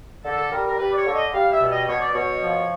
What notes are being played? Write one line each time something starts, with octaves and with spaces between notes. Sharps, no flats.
D3 A4
A4
G3 A#4
A#4
G3 B4
D5
C#5
D3
D#5
G3 F5
E5
B2
D#5
B2 C#5
D5
B2 C#5
F3